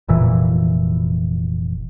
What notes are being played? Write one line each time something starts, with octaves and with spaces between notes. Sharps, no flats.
F1 A#2 E3